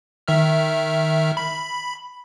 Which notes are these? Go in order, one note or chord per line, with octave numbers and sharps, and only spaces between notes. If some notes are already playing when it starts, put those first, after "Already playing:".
D#3 E5 F6
B5